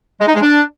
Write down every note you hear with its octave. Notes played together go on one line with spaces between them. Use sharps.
G#3
D#4
G#3
D4